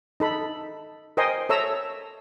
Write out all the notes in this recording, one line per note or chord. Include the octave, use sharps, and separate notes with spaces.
D#4 A4 B5
A#4 C5 D#5 G5 G#5 C6
A4 C#5 E5 A#5 E6